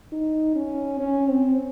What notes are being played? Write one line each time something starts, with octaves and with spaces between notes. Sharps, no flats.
D#4
C#4
C#4
C4